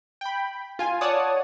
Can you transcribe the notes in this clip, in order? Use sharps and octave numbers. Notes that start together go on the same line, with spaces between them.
G5 B5
F4 G#5
C#5 D5 F#5 A5 D#6